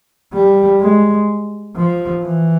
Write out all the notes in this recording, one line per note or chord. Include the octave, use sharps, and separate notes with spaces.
G3
G#3
F3
E3